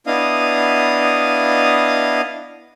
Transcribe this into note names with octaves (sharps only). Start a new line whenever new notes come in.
B3 D4 E4 D#5 F5 D#6